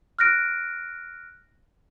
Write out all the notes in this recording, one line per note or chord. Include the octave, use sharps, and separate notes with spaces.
F6 F#6 A#6 D7